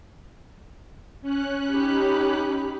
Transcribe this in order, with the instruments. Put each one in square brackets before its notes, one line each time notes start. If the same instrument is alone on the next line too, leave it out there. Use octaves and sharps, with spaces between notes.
[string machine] C#4 F#6
[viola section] D#4 G4 B5